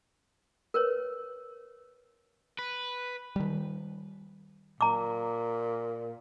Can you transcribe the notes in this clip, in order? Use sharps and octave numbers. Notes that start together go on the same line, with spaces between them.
A#4 B4 C#5
B4
D#3 G3
A#2 A#5 D6